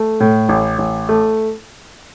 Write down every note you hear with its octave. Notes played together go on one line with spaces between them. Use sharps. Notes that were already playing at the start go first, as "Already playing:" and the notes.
Already playing: A3
A2
A1
A1
A3